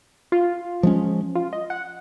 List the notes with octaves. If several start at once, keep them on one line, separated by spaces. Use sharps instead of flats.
F4
F3 G#3 C#4
F4
D#5
F#5